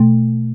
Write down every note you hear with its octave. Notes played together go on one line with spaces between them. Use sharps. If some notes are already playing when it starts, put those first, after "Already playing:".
Already playing: B2 A3